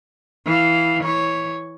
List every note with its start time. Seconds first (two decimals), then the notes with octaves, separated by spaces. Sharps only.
0.46 E3 F5
1.04 E3 C#5